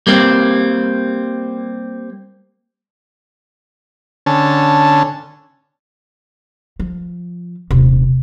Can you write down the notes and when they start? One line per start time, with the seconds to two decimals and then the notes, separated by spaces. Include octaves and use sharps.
0.07 G3 A#3 C4
4.26 D3 C#4 A5
6.80 F3
7.71 D#1 C3